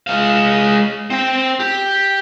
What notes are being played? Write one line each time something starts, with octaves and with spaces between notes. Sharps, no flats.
G#3 F5
C4 G5
G4